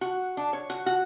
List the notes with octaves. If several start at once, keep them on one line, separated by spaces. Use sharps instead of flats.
F#4
D4
C#5
F#4
F#4